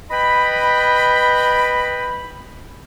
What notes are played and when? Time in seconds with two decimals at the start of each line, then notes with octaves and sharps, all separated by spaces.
0.11 B4 D#5 G5 B5